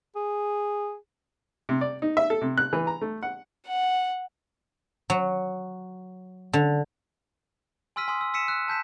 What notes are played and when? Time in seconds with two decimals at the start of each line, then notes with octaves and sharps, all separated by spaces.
0.16 G#4
1.69 C3
1.81 D5
2.02 D#4
2.17 E5
2.30 A4
2.42 C3
2.58 F#6
2.73 E3
2.87 A#5
3.01 A3
3.23 F#5
3.67 F#5
5.10 F#3
6.53 D3
7.96 G#5 C6 E6 F6 B6 D#7
8.08 G#5 C6 D#6
8.21 E6
8.34 E6 B6 C#7 D#7 E7
8.48 E6 F#6
8.68 A5 G6 B6 E7